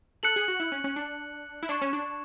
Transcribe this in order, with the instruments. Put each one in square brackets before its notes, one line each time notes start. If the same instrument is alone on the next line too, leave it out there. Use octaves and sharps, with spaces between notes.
[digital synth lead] A4 [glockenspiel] F#6 C#7 F#7
[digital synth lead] G#4
F#4
E4
C#4
C#4
D4
E4
[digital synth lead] D4 [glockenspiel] C#6 G#6 C#7 E7
[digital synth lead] C#4
D4